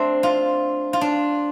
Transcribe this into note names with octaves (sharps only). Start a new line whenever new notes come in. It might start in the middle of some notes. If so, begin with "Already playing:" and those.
Already playing: A3 C4 D4
F4
F4
D4